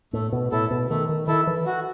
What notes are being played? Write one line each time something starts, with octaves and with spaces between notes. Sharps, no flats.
A2 A3
B2
A2 E4 A4
B2
D#3 A3
D#3
D#3 E4 A4
E3
F#4